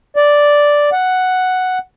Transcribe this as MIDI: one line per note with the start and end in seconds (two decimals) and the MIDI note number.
0.16 0.90 74
0.93 1.78 78